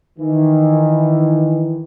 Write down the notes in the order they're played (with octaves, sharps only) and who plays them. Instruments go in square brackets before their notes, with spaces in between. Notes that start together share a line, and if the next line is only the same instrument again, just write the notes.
[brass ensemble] D#3 E3